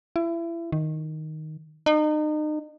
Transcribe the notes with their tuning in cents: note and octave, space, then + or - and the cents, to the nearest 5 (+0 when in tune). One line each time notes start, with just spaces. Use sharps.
E4 +30
D#3 +0
D#4 -35